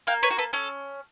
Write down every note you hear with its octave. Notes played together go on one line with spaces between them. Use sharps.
A#3 F5 G5
B4 C#5
F#4
A4 B4
C#4 A4